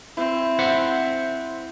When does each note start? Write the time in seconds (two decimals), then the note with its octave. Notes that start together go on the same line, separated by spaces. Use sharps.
0.17 C4 E4
0.59 C5 E5 F#5